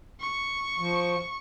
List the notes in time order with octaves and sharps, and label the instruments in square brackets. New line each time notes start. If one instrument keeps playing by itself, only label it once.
[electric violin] C#6
[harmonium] F3